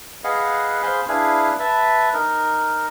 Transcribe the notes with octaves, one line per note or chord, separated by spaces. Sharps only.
G#4 B4 D#5 F5 F#5
G#4 C5 F5 G#5 B5 C6
D4 E4 G#4 B4 F5 G#5
B4 E5 A5
D#4 A#4